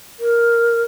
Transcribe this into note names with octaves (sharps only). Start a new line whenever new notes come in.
A#4